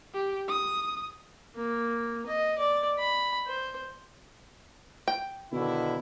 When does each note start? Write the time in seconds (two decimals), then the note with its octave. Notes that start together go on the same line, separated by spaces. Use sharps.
0.14 G4
0.48 D#6
1.56 A#3
2.27 D#5
2.58 D5
2.98 B5
3.47 C5
5.08 G5
5.52 B2 D3 D#3 E4